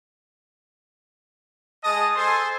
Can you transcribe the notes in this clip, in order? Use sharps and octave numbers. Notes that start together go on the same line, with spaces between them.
G#3 D#5 A5 D#6
A4 C5 G#5 A5 C6